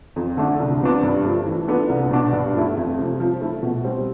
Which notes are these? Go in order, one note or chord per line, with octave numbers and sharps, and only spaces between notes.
F2
D3 A3 D4
C2
C3 F3 B3 D4
G2
F3 A3
E3
B3 D4 F4 A4
C2
B2 B3 D4
G2
F3 A3 E4
F2
C3 F3
F3
A3 E4
B2
G3 C4